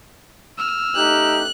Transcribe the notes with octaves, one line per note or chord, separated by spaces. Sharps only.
E6 F6
A3 D#4 G4 F#6